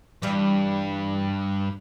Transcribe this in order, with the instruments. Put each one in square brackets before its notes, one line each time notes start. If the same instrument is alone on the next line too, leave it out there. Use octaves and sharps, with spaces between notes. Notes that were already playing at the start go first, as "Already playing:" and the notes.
[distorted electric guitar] G2 [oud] E3 G3 G4